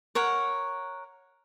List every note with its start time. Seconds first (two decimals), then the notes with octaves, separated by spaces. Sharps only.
0.15 A#4 C#5 F#5